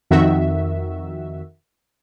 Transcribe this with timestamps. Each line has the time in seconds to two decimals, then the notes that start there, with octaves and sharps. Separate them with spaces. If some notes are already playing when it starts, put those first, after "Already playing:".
0.10 F2 D#3 F#4 E5